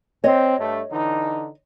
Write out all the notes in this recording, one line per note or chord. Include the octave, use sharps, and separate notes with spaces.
C4 C#5 D#5
G2 A3
D3 E3 D#4